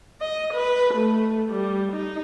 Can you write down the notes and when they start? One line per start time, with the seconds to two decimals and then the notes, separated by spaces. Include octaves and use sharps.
0.21 D#5
0.53 B4
0.94 A3
1.49 G3
1.92 D#4